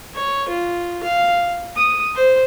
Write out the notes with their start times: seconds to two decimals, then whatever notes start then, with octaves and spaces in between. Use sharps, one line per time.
0.15 C#5
0.48 F4
1.03 F5
1.76 D#6
2.15 C5